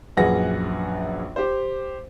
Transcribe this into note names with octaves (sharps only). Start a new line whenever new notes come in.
A#1 F#2 G#4 B4 F#5 A#6
G4 C5